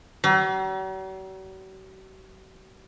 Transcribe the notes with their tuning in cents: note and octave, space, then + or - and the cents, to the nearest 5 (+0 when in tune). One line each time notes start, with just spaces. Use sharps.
F#3 +45